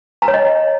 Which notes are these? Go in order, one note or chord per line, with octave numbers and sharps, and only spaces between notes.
A#5
C#5
D#5